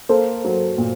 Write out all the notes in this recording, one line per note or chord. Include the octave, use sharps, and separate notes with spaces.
A#3 A4 C5
F#3
A#2